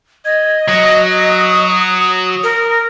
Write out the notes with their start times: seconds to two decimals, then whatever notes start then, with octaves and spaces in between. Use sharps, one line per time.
0.25 D#5 G#6
0.68 F#3 D#6
2.43 A#4